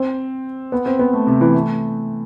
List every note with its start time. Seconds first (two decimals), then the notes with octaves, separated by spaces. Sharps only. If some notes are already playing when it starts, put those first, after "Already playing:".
Already playing: C4
0.72 B3
0.86 C4
0.99 B3
1.13 A3
1.27 C3
1.41 E3
1.54 A3